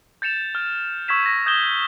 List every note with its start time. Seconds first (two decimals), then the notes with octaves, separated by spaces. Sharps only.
0.22 G6 A6 C#7 E7 F7
0.55 F6
1.08 C#6 E6 G#6 B6 E7
1.26 A#6
1.46 D#6 G6 G#6 E7 G7